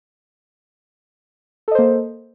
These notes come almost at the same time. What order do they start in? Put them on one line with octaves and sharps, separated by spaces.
A4 D#5 C5 A#3